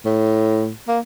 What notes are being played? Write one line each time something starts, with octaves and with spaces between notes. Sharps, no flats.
A2
A#3